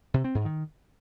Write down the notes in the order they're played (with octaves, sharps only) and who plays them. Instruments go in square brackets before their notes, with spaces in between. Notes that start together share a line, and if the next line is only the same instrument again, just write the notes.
[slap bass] C3
C4
G#2
D#3